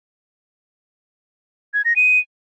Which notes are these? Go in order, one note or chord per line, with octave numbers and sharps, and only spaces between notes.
G#6
A#6
D#7